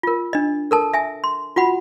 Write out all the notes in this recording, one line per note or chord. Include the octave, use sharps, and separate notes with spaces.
F4 A#4
D4 D#5
A4 A#4 A5
E5 G#5
C6
F4 F#4 F#5 B5